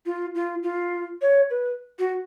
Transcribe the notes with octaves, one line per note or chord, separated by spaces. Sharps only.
F4
F4
F4
C#5
B4
F#4